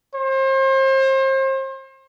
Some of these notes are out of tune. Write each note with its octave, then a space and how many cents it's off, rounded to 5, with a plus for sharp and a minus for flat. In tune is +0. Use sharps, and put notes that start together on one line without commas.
C5 +35